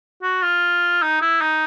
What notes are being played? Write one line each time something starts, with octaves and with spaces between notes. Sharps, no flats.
F#4
F4
D#4
E4
D#4